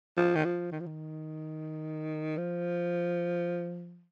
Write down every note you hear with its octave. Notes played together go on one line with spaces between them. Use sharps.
F3
D#3
F3
D#3
F3
D#3
F3